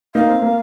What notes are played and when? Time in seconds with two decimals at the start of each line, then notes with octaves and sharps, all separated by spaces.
0.15 A#3 D#4 F5
0.29 C4
0.42 A#3